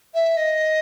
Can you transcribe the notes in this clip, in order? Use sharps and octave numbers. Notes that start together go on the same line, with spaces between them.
E5
D#5